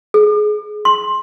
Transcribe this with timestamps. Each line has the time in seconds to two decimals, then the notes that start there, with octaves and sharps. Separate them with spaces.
0.14 G#4
0.85 C6